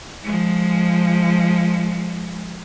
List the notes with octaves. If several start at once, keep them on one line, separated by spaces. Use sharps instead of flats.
F3 G#3